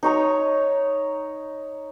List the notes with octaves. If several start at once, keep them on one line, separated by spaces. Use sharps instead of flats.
D#4 C#5 A#5